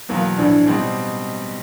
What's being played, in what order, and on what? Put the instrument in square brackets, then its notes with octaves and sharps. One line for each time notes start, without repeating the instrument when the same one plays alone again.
[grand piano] E2 B2 F#3 [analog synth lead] A#3
[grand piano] A#1 A2 E3 [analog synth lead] D4
[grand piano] B2 G3 C4 D#4